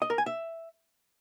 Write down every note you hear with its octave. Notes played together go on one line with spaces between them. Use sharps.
D#5
A#4
G#5
E5